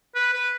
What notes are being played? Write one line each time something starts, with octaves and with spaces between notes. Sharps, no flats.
B4
B4